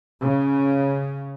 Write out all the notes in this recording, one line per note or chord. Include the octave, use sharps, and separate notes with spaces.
C#3